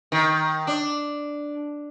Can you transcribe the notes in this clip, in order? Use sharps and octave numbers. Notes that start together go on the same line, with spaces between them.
D#3
D4